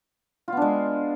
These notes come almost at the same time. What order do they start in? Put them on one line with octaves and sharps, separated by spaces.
F4 B3 D4 G#3